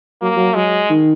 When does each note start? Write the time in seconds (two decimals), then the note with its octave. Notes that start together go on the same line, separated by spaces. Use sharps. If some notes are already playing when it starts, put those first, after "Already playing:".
0.22 F#3 A#3
0.36 F#3
0.55 F#3 G#3
0.89 D#3